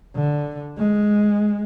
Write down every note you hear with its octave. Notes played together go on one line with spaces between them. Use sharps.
D3
G#3